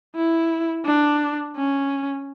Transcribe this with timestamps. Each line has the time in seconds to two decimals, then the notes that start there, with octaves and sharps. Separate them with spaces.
0.15 E4
0.85 D4
1.56 C#4